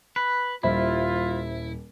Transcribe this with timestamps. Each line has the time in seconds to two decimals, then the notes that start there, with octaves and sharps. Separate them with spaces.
0.16 B4
0.63 D#1 G3 E4 F4 C5 D#5 E5 B5